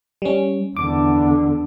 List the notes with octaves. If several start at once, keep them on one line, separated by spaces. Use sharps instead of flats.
G3 C#4
E2 D3 D6